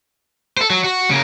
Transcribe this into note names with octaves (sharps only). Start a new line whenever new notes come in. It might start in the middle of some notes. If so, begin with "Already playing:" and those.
A4 C5
F#3
F#4
C#3 A#3